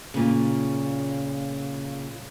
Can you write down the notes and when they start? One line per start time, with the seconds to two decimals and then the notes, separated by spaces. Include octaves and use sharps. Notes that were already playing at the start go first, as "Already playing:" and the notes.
0.14 A#2 C#3